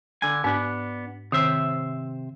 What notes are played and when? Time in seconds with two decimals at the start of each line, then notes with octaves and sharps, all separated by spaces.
0.22 D3 G#5
0.44 G#2 B3 D4
1.32 C3 D#3 C5 E5